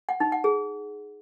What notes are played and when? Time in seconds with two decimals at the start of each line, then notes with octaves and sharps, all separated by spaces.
0.09 F#5
0.20 D#4
0.32 F#5
0.44 G#4